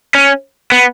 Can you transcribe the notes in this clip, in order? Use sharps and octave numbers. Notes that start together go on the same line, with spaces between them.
C#4
B3